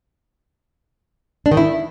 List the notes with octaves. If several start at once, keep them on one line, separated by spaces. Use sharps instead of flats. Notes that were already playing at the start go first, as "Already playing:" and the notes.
D4
D#3
E4